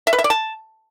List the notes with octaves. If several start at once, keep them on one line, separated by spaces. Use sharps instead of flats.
E5
B4
E5
D5
A5